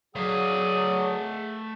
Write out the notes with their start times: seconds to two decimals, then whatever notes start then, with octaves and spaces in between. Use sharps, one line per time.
0.16 F#3 A3 G#4 D5 F5 F#5 D#6